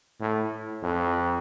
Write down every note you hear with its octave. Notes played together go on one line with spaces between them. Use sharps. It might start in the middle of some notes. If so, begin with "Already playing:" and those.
A2
F2